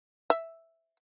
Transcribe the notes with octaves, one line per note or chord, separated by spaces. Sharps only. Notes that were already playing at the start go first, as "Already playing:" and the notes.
E5